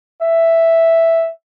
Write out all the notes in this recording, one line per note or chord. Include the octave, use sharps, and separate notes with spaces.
E5